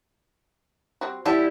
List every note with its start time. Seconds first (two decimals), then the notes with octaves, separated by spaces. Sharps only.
1.01 G3 C4 F#4
1.25 G3 E4 D5 F#5 A5